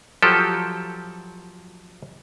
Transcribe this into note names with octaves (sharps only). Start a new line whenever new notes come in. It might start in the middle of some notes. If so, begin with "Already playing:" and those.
F3 F#3 G4 A4